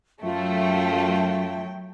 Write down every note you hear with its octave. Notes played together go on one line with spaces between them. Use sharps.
F#2 F#3 A3 F4 E5 G5